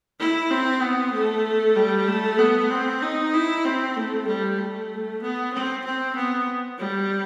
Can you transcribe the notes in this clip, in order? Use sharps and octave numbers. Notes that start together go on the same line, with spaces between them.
E4
C4
B3
A3
G3
A3
B3
C4
D#4
E4
C4
A3
G3
A3
B3
C4
C4
B3
G3